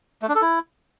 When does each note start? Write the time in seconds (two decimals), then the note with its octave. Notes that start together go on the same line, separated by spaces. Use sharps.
0.22 A3
0.29 D4
0.35 A4
0.42 E4